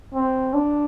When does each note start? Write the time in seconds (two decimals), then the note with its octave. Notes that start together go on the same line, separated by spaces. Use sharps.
0.14 C4
0.54 D4